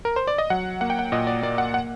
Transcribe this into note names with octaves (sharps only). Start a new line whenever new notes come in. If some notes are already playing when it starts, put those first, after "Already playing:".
A#4
C5
D5
D#5
F#3 F#5
A#3 F#5
G5
F#5
A#2 D#5
D5
A#3 D5
F#5
F#5